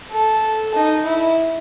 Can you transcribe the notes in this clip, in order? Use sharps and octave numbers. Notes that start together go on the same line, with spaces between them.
A4
D#4
E4